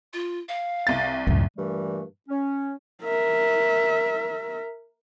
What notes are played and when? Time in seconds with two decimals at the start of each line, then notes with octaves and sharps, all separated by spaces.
0.13 F4
0.48 F5
0.87 C2 A6
1.27 C#2 F#2 A2
1.57 G2 A#2 E3 G3 A3
2.29 C#4
3.03 A#4 E5